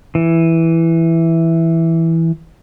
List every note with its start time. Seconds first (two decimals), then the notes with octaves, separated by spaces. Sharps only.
0.15 E3